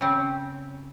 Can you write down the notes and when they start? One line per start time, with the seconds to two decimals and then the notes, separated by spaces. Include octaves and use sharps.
0.01 C#3 C4